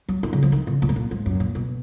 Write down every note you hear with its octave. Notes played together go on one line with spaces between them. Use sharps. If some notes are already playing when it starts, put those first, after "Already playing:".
F#3
D#3
C#3
F3
D#3
C#3
A#2
G#2
A#2
G#2
F#2
A#2
B2